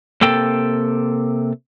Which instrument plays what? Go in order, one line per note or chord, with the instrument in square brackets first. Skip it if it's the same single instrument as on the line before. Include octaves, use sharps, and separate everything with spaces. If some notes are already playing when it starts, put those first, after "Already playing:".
[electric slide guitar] C3 A#3 A4 G5